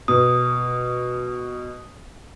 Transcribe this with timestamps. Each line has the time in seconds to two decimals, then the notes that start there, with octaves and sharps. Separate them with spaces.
0.08 B2 D#6